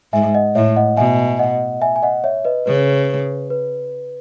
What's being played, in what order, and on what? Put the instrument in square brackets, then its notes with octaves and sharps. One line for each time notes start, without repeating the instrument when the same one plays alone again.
[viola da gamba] G#2 [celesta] E5 G#5
[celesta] D#5 F#5
[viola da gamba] A2 [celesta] C#5 E5
[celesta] D#5 F#5
[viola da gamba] B2 [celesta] E5 G#5
[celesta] D#5 F#5
E5 G#5
G#5
D#5 F#5
C#5 E5
B4 D#5
[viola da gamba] C#3 [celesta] B4
[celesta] B4